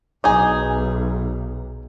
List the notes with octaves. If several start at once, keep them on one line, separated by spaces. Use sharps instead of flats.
B1 D#4 G#4